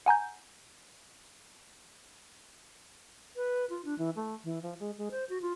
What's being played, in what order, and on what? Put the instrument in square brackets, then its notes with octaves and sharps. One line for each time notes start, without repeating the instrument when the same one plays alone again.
[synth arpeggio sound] F#5 G#5 A#5 G6
[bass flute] B4
F4
D4
E3
A3
E3
F3
G#3
G#3
C5
F#4
F4